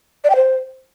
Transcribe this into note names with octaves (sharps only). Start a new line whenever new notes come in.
D5
G5
C5